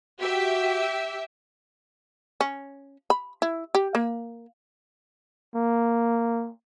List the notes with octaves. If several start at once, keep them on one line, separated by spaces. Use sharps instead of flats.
F#4 G4 E5
C#4
B5
E4
G4
A#3
A#3